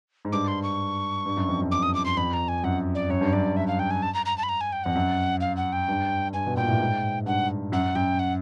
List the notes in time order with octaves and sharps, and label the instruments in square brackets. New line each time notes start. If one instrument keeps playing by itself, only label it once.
[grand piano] G#2
[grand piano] G2 [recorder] D6
[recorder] C6
C#6
[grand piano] G2
F#2
F2
F#2
[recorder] D6
D#6
D6
C6
[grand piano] F2 [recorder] B5
[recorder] A#5
G#5
[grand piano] F#2 [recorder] F#5
[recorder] D5
[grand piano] F#2 [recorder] C#5
[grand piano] G2
[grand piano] F#2 [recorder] D5
[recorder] E5
F5
G5
G#5
A5
A#5
A#5
A5
B5
A#5
G#5
G5
[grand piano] F2 [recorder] F#5
[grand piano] F#2
[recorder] F5
F#5
G5
[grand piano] G2
[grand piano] G2 [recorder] G#5
[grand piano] B2
[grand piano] A#2 [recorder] G5
[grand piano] A2
G#2
[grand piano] G2 [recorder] F#5
[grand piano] F#2 [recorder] F#5
[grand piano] F#2 [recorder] G5
[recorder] F#5